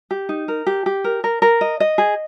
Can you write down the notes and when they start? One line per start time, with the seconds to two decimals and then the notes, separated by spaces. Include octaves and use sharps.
0.11 G4
0.29 D#4
0.48 A#4
0.67 G4
0.86 G4
1.04 A#4
1.24 A#4
1.42 A#4
1.61 D#5
1.80 D#5
1.98 G#4